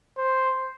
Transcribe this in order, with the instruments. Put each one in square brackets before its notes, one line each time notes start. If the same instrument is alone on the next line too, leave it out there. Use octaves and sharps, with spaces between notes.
[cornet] C5